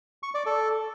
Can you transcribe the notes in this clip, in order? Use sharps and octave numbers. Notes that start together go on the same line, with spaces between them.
C#6
D5
A4